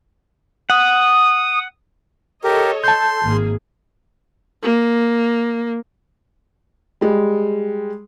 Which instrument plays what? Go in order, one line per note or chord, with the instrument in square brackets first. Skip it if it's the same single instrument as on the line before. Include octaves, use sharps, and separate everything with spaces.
[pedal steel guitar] F#5 [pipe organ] D#6
[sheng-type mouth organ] G4 A#4 [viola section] A4 C#5 D#5
[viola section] A4 [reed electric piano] A5 G6 [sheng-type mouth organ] C6
[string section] G#1 [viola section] A#3 G#4
[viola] A#3
[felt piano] G3 G#3